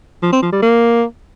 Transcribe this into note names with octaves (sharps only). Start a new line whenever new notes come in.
F3
C4
F3
G3
A#3